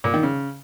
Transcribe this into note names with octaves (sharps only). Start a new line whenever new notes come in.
A#2
D#3
C#3